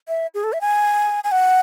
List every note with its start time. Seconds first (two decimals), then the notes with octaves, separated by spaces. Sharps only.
0.08 E5
0.34 G#4
0.44 A4
0.53 E5
0.61 G#5
1.24 G#5
1.31 F#5